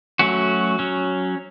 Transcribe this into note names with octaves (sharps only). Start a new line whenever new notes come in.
F#3 A3 C#4 F#4
F#3 C#4